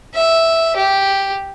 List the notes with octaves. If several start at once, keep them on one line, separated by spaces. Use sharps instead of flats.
E5
G4